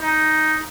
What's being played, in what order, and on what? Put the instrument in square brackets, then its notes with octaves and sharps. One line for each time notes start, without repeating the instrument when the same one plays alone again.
[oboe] D#4